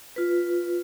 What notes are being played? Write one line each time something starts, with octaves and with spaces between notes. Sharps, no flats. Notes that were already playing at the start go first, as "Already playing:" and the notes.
F4 B4